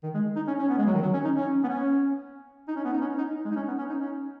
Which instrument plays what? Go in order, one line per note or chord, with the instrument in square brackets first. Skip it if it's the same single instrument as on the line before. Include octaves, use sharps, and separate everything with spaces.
[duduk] D#3
G#3
D#4
C#4
C#4
B3
G#3
F#3
D#3
F#3
C#4
D#4
C#4
B3
C#4
D#4
C#4
B3
D#4
C#4
D#4
G#3
D#4
C#4
B3
C#4
D#4
C#4